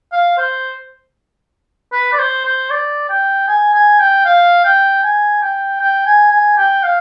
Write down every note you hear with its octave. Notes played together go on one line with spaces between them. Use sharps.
F5
C5
B4
D5
C5
C5
D5
G5
G#5
G#5
G5
F5
G5
G#5
G5
G5
G#5
G#5
G5
F5